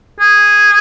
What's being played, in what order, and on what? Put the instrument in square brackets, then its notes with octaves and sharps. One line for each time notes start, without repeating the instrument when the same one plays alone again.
[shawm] G#4